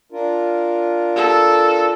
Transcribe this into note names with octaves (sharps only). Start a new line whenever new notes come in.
D4 F4 A#4
A4